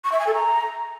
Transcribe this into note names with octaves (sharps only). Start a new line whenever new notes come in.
C#6
E5
G#5
A4
A#5